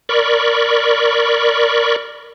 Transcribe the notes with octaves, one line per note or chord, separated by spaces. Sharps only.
A#4 D5 B5 C#6